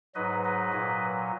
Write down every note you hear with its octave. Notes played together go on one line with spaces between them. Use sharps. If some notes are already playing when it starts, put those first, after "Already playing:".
G#2 F#3 B4 D#5
B4 D#5
A#2 F#3